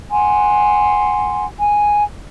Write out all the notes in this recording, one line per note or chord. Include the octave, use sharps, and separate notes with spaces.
F#5 G#5 C6
G#5